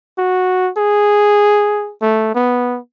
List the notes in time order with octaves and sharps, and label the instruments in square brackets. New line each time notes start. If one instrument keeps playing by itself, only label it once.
[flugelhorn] F#4
G#4
A3
B3